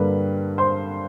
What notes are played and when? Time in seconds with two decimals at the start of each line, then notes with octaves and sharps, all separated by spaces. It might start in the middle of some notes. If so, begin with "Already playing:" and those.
Already playing: G2 D3 G3 A#3 B4
0.58 C5 C6